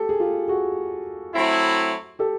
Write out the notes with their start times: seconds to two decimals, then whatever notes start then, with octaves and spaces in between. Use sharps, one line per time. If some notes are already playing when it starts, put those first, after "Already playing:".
Already playing: G4 A4
0.09 G#4
0.20 F4 G4
0.48 F#4 G#4
1.34 F#3 A3 C4 E4
2.19 G4 A4